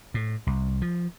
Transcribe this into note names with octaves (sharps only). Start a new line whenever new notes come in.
A2
C2
F3